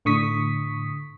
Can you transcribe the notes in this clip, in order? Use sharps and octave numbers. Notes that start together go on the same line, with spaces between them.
A2 D3 C#6 D#6 B6